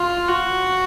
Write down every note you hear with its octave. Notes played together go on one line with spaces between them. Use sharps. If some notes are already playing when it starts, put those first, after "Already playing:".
Already playing: F4
F#4